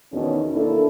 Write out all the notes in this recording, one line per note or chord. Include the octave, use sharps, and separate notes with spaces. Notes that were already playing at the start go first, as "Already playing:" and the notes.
E2 B2 D#3 C#4
A#3 D4 E4 A4